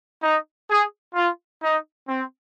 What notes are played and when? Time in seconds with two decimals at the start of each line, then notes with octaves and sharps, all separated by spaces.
0.23 D#4
0.70 G#4
1.15 F4
1.62 D#4
2.08 C4